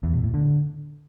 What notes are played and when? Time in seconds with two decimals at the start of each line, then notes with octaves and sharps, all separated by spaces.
0.03 E2
0.14 B2
0.24 A2
0.34 D3